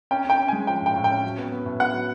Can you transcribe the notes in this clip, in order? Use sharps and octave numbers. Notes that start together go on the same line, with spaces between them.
C#4 G5
C#4 G5
C#4
G#5
G#3
F3 G5
A2 G5
A2
G5
C#4
F#3
B3
B3
A2
B3 F#5
F#3